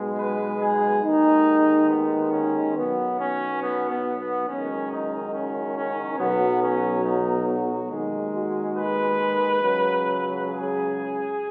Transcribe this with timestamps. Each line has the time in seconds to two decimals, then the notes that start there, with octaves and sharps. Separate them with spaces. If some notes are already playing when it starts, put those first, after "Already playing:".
Already playing: B1 B2 G#3
0.18 B4
0.61 G#4
1.04 D#2 D#3 G#3 D#4
1.90 B3
2.33 C#4
2.75 B1 B2 F#3 B3
3.18 C#4
3.62 B3
3.90 B3
4.19 B3
4.47 F#1 F#2 D#3 G#3 C#4
4.90 D#4
5.33 C#4
5.76 C#4
6.19 B1 B2 F#3 B3
6.62 C#4
7.04 D#4
7.47 F#4
7.91 D#2 D#3 G#3
8.34 F#4
8.77 B4
9.62 C#2 C#3 F#3
10.48 G#4